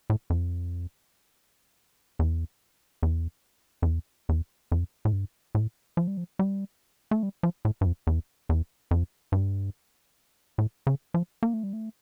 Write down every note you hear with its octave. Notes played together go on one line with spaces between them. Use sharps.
A2
F2
E2
E2
F2
E2
E2
F2
A2
G2
A2
F3
G3
F3
G3
A3
G3
F3
A2
G2
F2
E2
E2
F2
G2
A2
C#3
F3
A#3
A3
G3
A3